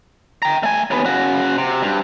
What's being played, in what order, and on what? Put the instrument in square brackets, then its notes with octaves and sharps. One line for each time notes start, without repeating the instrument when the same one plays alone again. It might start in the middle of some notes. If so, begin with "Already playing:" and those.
[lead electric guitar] G5 A#5
A3 G#5
D#2 B3
C#3 F#4
C3
G2